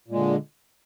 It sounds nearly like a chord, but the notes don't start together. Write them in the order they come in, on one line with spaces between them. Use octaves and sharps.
A#2 G#3 D3